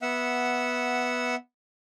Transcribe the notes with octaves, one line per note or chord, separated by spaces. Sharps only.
B3 E5 F#5